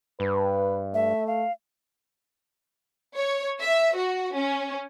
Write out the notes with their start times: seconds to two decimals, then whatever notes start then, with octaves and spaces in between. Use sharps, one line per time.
0.20 G2 B4
0.94 A3 E5
1.27 F5
3.16 C#5
3.62 E5
3.96 F#4
4.34 C#4